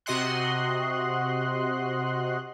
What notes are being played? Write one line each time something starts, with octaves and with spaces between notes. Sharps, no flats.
C3 F#4 D#5 F#5 C6 F#6